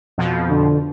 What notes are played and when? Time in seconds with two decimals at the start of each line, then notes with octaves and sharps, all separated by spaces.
0.18 F2 B2 F3
0.49 D3